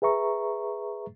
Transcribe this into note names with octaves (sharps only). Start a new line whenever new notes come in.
G#4 B4 E5 A#5 C#6